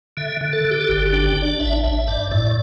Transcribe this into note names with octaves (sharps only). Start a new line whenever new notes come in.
D3 E5
D3
A4
D3
G4
A4
G1 G4
G4
D4
G5
D4
D5
A1 E5
A1 E5
G2 D5
A2 D5